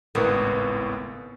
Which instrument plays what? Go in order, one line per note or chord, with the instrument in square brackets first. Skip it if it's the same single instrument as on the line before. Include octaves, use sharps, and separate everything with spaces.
[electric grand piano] G#1 C#2 A2 [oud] B3 A#4